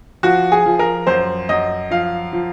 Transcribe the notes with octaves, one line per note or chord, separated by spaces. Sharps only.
F3 F#4
G#4
F3
A#4
F#2 C5
F#2 D#5
F3 F5
F3